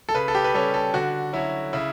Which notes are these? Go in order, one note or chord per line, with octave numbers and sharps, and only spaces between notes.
A4
C#3 B4
A4
G4
B4
G3 C#4 A4
A4
D3 F#4
F#3 C#4 E4
C#3 E4